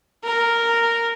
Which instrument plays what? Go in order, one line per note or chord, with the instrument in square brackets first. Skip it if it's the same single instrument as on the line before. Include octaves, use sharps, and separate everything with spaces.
[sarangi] A#4